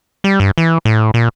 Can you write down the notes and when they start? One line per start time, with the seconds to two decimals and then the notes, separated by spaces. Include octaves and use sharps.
0.24 G3
0.40 G2
0.58 E3
0.85 A2
1.14 A#2